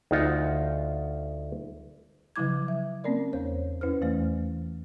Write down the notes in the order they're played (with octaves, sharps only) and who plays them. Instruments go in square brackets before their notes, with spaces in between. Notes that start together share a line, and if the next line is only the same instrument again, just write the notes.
[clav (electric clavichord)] D2 D#4 F4 F#5
[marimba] C#3 F3 F#3 E4 D6 G#6
E5
A#3 C4 C#4 A#4 D5
E2 C5 C#5
F2 C#4 E4 B4 C5 F6
E2 E3 A3 C5